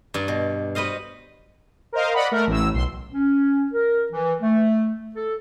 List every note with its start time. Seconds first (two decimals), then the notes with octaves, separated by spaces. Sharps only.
0.14 G2 D5 A#5
0.28 B2
0.75 F#4 B4 C5 D#5 F5
1.92 A#4 C5 D#5 F5
2.13 D5 D#5 F#5 B5
2.31 A3 A#4
2.47 A1 A2 E6
2.74 B1 C6
3.13 C#4
3.72 A#4
4.12 E3
4.42 A3
5.16 A4